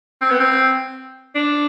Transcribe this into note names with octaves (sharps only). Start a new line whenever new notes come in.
C4
B3
C4
D4